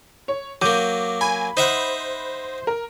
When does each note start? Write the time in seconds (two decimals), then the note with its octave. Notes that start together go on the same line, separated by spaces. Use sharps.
0.28 C#5
0.62 F#3 A#3 D6 G6 D#7
1.21 G#5 B5
1.57 D#4 C5 E5 F#5
2.67 A#4